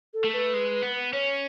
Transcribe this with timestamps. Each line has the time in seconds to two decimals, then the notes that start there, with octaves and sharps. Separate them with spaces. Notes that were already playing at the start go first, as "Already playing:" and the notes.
0.14 A4
0.24 A3
0.33 B4
0.54 G#3
0.82 B3
1.13 C#4 C#5